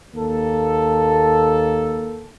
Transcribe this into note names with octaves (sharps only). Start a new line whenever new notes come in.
D#2 A#3 A4